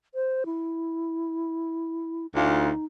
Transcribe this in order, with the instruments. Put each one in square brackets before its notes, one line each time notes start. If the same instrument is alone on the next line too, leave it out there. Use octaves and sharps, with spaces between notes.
[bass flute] C5
E4
[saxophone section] D2 F4 [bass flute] D#4